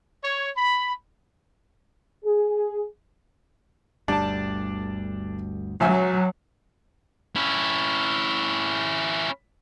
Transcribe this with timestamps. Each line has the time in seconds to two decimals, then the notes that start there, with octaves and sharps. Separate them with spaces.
0.24 C#5
0.57 B5
2.25 G#4
4.08 G1 D2 G3 D4 A5
5.80 C#2 F#3 E5 G#5
7.36 C#4 E4